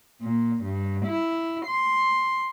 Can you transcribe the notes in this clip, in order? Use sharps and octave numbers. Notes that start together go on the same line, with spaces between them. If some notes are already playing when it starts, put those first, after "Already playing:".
A#2
G2
E4
C6